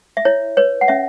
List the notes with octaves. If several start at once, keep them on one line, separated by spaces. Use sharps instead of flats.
E5
E4 C#5
B4 C#5
F#5
C#4 E5